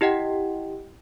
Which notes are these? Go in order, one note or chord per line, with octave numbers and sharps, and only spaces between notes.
E4 G4 D#5 F#5 G5